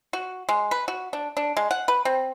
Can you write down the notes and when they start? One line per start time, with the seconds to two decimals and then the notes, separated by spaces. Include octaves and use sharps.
0.13 F#4
0.49 G#3
0.71 B4
0.88 F#4
1.13 D4
1.37 D4
1.57 G#3
1.71 F#5
1.88 B4
2.05 C4